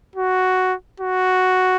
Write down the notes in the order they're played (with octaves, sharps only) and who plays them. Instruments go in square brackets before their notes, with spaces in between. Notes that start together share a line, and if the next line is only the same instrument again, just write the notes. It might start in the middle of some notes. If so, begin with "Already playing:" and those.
[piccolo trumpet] F#4
F#4